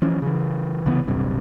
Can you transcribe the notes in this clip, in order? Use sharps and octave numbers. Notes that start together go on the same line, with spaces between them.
E3 F3 C#4
C#3 E3
C2 C#3 E3 B3
D#1 B1 G2 C3